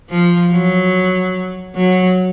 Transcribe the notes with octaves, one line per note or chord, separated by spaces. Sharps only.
F3
F#3
F#3